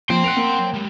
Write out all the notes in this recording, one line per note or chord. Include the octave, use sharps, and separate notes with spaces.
F3 A#3 G5 C6
A#4 F#5 F#6 D7 F7
A#3
F#3
G#3 G4